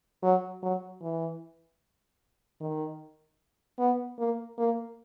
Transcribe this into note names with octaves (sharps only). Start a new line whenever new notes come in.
F#3
F#3
E3
D#3
B3
A#3
A#3